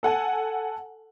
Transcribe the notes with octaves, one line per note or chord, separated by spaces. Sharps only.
A4 F#5 G#5 A5